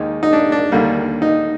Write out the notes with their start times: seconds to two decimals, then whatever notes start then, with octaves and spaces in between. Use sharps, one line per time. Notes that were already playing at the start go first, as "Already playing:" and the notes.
Already playing: D#2 D#3 G#3 D#4
0.23 D#4
0.33 D4
0.52 D4
0.72 D#2 D3 G3 A#3
1.22 D#4